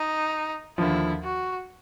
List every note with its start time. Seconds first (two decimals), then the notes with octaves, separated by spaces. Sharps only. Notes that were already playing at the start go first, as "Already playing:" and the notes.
Already playing: D#4
0.78 D#2 D3 F3 E4
1.23 F#4